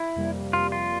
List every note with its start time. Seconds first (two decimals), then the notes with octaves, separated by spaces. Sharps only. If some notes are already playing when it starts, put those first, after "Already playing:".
Already playing: E4
0.16 F2 C3 G3 A#3
0.53 F2 C3 G3 A#3 F4
0.72 F4